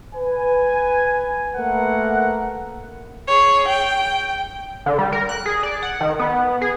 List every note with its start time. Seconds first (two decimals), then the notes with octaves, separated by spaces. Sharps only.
0.15 B4 G#5
1.56 A3 A#3 A#4 B4 F#5
3.28 G#4 C#5
3.68 G5
4.86 D3
4.99 G3
5.12 A#4
5.29 F#6
5.46 G#4
5.63 D5
5.82 F#5
6.01 D#3
6.19 B3
6.61 G#4